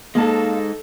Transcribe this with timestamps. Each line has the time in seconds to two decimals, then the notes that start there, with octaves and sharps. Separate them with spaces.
0.15 G#3 A#3 D#4 A4 F5 A5